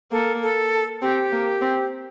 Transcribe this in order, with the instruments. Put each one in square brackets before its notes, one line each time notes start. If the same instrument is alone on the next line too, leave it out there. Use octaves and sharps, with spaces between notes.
[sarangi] A#3 [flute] A4
[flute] A4
[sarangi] C4 [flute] G4
[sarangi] A#3
C4